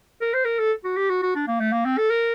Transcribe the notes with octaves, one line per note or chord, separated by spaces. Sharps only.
A#4
C5
A#4
A4
F#4
G4
F#4
F#4
D4
A#3
A3
A#3
C4
A4
A#4